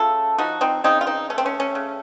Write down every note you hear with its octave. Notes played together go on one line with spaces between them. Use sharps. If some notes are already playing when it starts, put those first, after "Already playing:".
Already playing: C#3 A3 F4 A4
F3 D#4 F#4
C4 D#4
C#3 C4 D#4
F4
C4 D#4
A3 C#4
C4
C#4
C#4
C#3